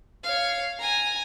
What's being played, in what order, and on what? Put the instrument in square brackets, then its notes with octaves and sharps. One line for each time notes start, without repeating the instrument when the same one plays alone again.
[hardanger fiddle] C#5 F5
G#5 A#5